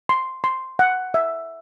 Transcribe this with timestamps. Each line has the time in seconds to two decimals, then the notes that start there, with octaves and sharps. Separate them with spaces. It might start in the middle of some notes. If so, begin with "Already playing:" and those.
0.09 C6
0.44 C6
0.79 F#5
1.14 E5